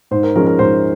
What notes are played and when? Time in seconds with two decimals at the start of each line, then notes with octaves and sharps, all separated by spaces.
0.11 G#2 C5
0.23 A#4
0.35 F3 G#3 C#4 A#4
0.47 A#4
0.59 G#2 C5